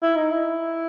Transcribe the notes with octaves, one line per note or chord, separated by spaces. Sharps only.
E4
D#4
E4